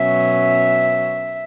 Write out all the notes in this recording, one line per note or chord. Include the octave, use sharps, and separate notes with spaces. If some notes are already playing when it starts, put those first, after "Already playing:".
Already playing: B2 F#3 C#4 E5